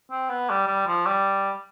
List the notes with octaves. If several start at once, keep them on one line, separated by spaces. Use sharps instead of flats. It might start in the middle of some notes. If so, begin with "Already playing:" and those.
C4
B3
G3
G3
F3
G3